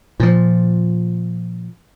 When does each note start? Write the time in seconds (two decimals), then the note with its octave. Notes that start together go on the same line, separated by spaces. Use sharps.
0.20 A#2 F3